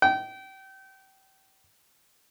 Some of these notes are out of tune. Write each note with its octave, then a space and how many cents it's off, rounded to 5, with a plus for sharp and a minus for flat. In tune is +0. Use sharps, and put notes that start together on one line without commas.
G5 -30